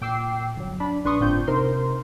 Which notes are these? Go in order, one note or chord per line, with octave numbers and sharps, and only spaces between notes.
A#2 G5 D6 E6 C7
G1 F#3
D4 B5
A#1 D4 B4 C6 C#6 D#6
G1 A2 C4 D4 F4 G6
C3 D#4 A#4 C5 C6